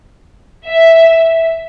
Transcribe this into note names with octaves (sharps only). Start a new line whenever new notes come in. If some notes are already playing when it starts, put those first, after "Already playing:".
E5